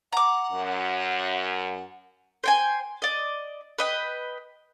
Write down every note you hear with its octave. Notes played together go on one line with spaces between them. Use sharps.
F#5 A#5 D6
F#2
C5 G5 G#5
D5 D#5
B4 D#5 G5